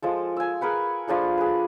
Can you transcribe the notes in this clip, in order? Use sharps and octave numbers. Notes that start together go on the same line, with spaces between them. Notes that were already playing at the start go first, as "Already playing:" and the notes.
F3 G#3 A4
G#5 E6
G#4 A#4 B4 F#5
F3 D4 G#4 A4
G#4 B4